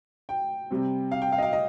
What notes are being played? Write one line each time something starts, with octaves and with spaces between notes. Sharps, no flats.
G5
C3 G3 C4
F5
G5
F5
D#5
F5
D#5